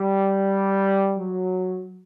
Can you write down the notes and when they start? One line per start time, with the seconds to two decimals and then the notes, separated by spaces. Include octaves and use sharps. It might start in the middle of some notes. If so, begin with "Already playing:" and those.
Already playing: G3
1.17 F#3